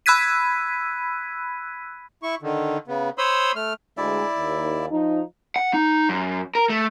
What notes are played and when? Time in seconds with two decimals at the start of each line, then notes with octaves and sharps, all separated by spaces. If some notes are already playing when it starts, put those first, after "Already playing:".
0.06 B5 E6 F#6 G#6 B6 D#7
2.23 E4 C#6
2.42 D3 D#3
2.88 C#3 B3
3.18 C5 C#5 B5 C6 D#6 E6
3.56 A3 F6
3.97 D2 G#3 E4 D5 E5
4.38 D#2
4.91 F3 D#4
5.56 F#5
5.74 D#4
6.09 F#2
6.55 A#4
6.70 A3